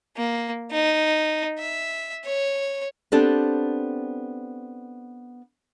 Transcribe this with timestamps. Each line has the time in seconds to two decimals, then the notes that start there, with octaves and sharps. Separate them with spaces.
0.17 A#3
0.71 D#4
1.59 E5
2.25 C#5
3.12 B3 C4 D4 G4 A4